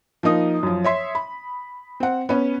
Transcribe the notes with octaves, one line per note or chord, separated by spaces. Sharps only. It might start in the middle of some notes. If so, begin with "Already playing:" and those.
F3 A#3 D#4 D#6
F#2 F3
C#5 E5 C6
B5
C4 F#5
B3 C#4